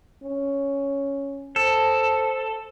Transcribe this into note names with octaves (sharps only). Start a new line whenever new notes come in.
C#4
A4 C5